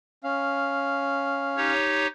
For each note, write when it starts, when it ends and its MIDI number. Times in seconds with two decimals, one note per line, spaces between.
0.24 1.72 61
0.24 1.72 77
1.57 2.07 63
1.57 2.07 67
1.57 2.07 73